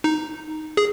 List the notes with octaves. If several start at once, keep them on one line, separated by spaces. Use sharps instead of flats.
D#4
G#4